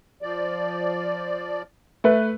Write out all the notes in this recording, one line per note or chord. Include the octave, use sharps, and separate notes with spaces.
F3 D5
A3 B4